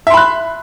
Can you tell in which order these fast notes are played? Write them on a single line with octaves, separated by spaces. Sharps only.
E5 C6 B5 F#6